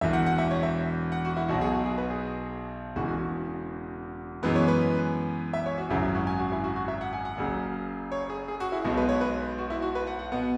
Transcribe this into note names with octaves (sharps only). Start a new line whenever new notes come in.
E1 E2 E3 E5
F#5
F#5
E5
C#5
E5
F#5
F#4
E4
B1 B2 F#3 F#4
G#4
F#4
G#4
B4
G#4
E1 E2 C#3 E3 F#4
F#4
F#2 E3 G#3 B3 B4
C#5
B4
E5
C#5
F#4
G#1 F#2 C#3 F#3 E4
E4
F#4
G#5
F#4
E4
F#4
F#4
E5
F#5
G#5
F#5
F#1 F#2 C#3
C#5
G#4
G#4
F#4
E4
B1 B2 G#3 B3 F#4
B4
C#5
B4
F#4
E4
F#4
B4
F#5
F#5
B2 B3 F#5